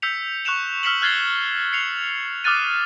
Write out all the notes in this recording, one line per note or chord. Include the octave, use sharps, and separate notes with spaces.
E6 G6 B6 C#7 F7
C#6 F#6 C#7 E7 F7
E6 F6 B6 C#7 E7 F#7
F6 F#6 G#6 A6 C7 G7
C7 C#7 F7
D6 D#6 F6 F#6 A6 D#7